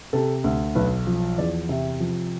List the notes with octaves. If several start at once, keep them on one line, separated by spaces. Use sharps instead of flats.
C3 A4
D2
B1 B4
F3
E2 D5
C3 E5
F3